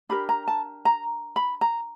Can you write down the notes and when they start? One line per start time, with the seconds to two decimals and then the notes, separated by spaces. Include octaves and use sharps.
0.09 D4 G4 A#4 B5
0.29 A#5
0.48 A5
0.85 A#5
1.36 B5
1.61 A#5